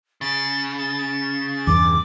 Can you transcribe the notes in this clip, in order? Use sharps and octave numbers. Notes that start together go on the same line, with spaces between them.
C#3 A6
E2 G2 C#3 D6